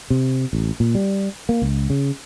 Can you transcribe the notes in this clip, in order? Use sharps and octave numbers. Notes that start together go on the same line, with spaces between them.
C3
A1
A#2
G3
A#3
C#2
C#3